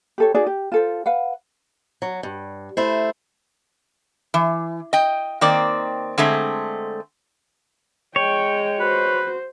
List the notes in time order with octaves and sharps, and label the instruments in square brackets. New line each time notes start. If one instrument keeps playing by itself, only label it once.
[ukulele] G4 A4 C#5
D#4 F#4 G#4 D5
G4
F4 A4 C5
B4 F5 F#5
[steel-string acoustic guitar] F#3
G2
A3 E4 C5
[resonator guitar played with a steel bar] E3
D#5 G5
D#3 A#3 C4 D5
D3 G#3 A3 C4
[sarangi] G#3 [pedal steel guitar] C#5 [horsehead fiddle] G5
[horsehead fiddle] F#4 C5 [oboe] B4